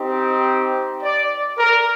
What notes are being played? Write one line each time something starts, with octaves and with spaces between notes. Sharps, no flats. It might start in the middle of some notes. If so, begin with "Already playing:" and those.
Already playing: C4 D#4 G4
D5
A#4